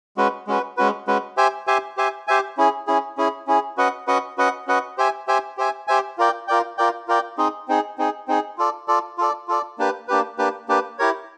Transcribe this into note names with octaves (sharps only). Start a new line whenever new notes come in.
G#3 C#4 F#4 B4
G#3 C#4 F#4 B4
G#3 C#4 F#4 B4
G#3 C#4 F#4 B4
G4 C5 E5 G#5
G4 C5 E5 G#5
G4 C5 E5 G#5
G4 C5 E5 G#5
C#4 E4 G#4
C#4 E4 G#4
C#4 E4 G#4
C#4 E4 G#4
C#4 F#4 B4 D#5 F#5
C#4 F#4 B4 D#5 F#5
C#4 F#4 B4 D#5 F#5
C#4 F#4 B4 D#5 F#5
G4 C5 E5 G#5
G4 C5 E5 G#5
G4 C5 E5 G#5
G4 C5 E5 G#5
F4 A#4 D5 G5
F4 A#4 D5 G5
F4 A#4 D5 G5
F4 A#4 D5 G5
C4 D#4 G#4
C4 D#4 G#4
C4 D#4 G#4
C4 D#4 G#4
F4 A4 D5
F4 A4 D5
F4 A4 D5
F4 A4 D5
A#3 D4 G4 B4
A#3 D4 G4 B4
A#3 D4 G4 B4
A#3 D4 G4 B4
E4 G4 A#4 C#5